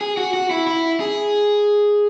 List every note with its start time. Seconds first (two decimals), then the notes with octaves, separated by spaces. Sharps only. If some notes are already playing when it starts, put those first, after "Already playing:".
0.01 G#4
0.17 F#4
0.34 F#4
0.51 E4
0.67 E4
1.00 G#4